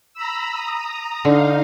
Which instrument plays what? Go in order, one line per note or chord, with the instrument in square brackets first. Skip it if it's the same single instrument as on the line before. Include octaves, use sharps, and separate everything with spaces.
[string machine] A#5 B5 E6
A#5 D#6
[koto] D3 [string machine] D#4 F5